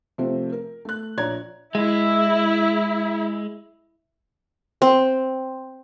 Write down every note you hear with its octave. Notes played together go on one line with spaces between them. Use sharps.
C3 F3 A3 C4
A#4
A3 F#6
A#1 C#5 D5 A#5 G#6
G#3 E4
C4